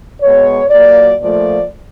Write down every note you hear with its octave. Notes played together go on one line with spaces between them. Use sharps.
B2 G#3 B3 C#5
A#2 F#3 A#3 D5
A#2 F3 A3 D5